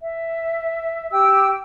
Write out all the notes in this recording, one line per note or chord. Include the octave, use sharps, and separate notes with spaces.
E5
G4 G5 E6